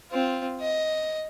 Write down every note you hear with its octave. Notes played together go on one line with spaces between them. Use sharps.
C4 F4
D#5